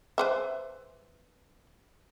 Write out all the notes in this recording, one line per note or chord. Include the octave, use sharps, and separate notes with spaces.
B4 C5 E5